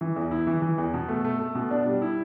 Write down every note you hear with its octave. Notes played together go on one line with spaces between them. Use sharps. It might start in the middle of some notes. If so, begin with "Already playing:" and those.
E3
E2
E4
E3
E3
E2
B2
A3
A3
A3
B2
D4
G3
E4